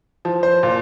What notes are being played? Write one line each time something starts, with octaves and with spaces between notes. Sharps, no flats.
F3
C5
A#2